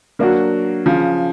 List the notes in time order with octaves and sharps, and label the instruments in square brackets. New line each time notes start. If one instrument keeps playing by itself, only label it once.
[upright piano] F#3 A#3 D4 F#4
C#3 F3